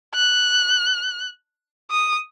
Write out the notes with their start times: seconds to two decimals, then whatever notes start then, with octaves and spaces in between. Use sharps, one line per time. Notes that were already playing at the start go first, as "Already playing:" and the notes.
0.15 F#6
1.91 D#6